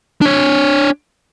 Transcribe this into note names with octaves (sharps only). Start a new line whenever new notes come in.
D4 C#5